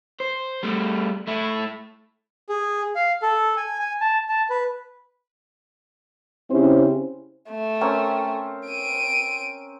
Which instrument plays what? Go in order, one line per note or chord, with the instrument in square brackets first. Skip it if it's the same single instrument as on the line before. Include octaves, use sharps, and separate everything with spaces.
[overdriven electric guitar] C5
G3 A3
A3 E4
[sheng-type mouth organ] G#4
F5
A4
G#5
G#5
A5
A5
B4
[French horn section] C#3 C4 C#4 E4 G4 C5
[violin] A3
[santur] C4 C#4 A#4
[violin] D7 D#7